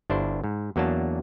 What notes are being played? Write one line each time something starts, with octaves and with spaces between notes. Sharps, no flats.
G1 D4 E4 C5
G#2
E2 F#3 A#3 D4 A5